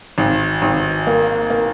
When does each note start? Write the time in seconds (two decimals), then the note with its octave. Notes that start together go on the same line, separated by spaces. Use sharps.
0.18 G#1
0.62 G#1
1.07 A#3
1.50 A#3